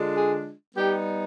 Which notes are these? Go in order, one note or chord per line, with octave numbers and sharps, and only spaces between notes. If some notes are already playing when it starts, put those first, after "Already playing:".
Already playing: D3 G#3 D4 F4
G#4
G3 B3 D#4 G4